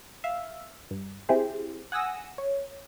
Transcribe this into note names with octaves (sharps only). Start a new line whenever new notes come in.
E5 F5
G2
C4 E4 G4 G#4 C5
F#5 G#5 D#6 E6 A#6
C#5